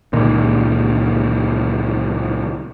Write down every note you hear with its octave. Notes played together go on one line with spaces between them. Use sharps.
C#2 A#2 D#3